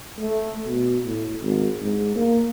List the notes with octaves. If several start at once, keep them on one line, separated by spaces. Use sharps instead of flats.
A3
B2
A2
G#1
G#2
A#3